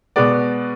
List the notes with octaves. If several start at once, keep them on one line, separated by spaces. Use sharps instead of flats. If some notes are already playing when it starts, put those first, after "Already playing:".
B2 G#3 B3 D5